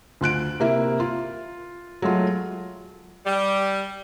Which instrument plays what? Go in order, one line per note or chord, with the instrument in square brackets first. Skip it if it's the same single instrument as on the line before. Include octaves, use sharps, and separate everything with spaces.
[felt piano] D2 F4 F#6 D7
C3 A#3 E4
F4
F#3 G#3 A3 F4
[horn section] G3